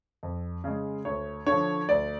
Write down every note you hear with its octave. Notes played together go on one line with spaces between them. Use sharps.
F2
C#3 G#3
D2 C#5
D3 F3 C#5
D2 D5